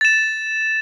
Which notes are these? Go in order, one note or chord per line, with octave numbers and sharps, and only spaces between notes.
A6 E7